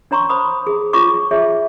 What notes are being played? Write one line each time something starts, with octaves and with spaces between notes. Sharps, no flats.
D4 C#5 A#5 C6 C#6
C5 B5 D#6
G#4
F4 G#4 C#5 C#6 D6
G#4 C#5 E5